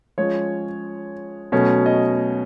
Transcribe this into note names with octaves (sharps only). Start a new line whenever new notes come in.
F3 G#3 C#4 C#5
B2 F#3 A3 C#4
D#5